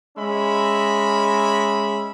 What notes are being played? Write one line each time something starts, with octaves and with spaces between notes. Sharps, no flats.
G#3 C#4 E5 B5